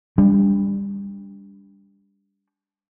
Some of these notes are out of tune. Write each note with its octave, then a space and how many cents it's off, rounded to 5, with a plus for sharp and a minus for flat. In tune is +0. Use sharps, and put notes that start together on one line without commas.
G3 +25 D4 -25